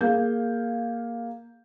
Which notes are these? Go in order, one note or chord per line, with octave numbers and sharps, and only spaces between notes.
A#3 G#4 F5 G6